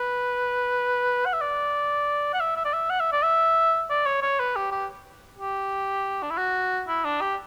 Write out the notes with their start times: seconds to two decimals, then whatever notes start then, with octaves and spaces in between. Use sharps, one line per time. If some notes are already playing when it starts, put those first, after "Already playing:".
Already playing: B4
1.25 F#5
1.33 E5
1.41 D5
2.33 F#5
2.40 E5
2.56 E5
2.65 D5
2.73 E5
2.90 F#5
3.00 E5
3.12 D5
3.23 E5
3.90 D5
4.06 C#5
4.22 C#5
4.39 B4
4.56 G4
4.72 G4
5.39 G4
6.23 D4
6.30 E4
6.37 F#4
6.87 E4
7.04 D4
7.21 G4